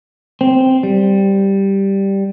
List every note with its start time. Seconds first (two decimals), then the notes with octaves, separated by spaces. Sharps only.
0.41 C4
0.83 G3